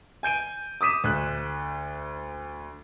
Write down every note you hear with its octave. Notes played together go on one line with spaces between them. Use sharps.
G#5 G6 D7 D#7
D6 D#6 B6 D#7 E7
D2 F#6